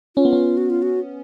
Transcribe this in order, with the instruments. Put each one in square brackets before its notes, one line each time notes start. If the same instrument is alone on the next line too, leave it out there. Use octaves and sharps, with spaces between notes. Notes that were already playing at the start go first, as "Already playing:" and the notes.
[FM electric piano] C#4 [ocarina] F4
[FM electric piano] B3
C#4
[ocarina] F#4
F4
F#4